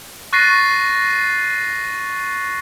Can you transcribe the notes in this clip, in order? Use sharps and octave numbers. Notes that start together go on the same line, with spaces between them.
C#6 F#6 A6 A#6 C7 D#7